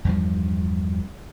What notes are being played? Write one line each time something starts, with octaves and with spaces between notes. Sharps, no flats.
E2 G2 F3